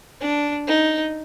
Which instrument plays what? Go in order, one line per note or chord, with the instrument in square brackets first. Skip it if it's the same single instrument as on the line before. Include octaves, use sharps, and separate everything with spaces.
[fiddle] D4
D#4